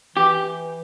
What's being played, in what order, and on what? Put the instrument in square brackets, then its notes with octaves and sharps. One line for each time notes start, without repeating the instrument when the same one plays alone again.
[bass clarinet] E3 [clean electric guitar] G4